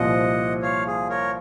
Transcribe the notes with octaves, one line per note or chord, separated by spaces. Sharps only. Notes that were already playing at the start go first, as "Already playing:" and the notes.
Already playing: C2 A#2 F3 C4 F4 D#5 F#5
C#5 F5
G#4
A#4 C#5